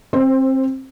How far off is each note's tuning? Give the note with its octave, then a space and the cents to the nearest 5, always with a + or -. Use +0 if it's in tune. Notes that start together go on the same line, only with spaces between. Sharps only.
C4 +25 C5 +0